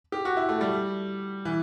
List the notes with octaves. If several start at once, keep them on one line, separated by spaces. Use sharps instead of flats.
G4
F#4
E4
A3
G3
E3